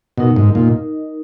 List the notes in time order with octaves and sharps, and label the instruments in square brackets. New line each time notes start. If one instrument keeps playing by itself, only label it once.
[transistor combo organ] B2 [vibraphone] D#4 A#4 D#5
[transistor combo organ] G#2
A#2